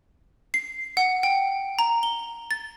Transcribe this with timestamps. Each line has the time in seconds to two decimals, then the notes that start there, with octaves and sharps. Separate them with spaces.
0.54 C7
0.97 F#5
1.23 G5
1.79 A#5
2.03 G7
2.51 A6